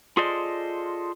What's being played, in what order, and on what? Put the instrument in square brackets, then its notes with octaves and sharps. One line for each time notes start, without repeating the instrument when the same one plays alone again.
[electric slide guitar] F4 G#4 A4 C5 D5 D#5